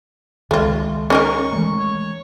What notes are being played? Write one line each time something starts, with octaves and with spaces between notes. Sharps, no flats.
C#2 D#3 G#3 A3 F4
C#4 D#4 A#4 C#6
E3 G#3 A3
C#5